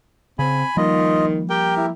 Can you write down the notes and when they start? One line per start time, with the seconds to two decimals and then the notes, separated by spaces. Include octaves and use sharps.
0.39 C#3 C4 G#5 B5
0.77 D#3 F3 G3 A#3 F4 D#5
1.50 G4 A#4 G5
1.77 E4